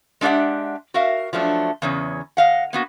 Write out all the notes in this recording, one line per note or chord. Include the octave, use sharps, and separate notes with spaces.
G#3 D4 G4 D5 E5 F#5
F#4 A#4 E5 F5
F3 F#3 A3 D4
E2 C#3 C#4
D#5 F5 F#5
A#3 B3 F#4